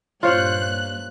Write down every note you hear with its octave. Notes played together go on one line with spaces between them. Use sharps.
G2 A#2 F4 C5 C#5 F#6